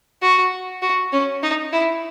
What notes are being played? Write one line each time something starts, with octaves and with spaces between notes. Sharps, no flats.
F#4
F#4
C#4
D#4
E4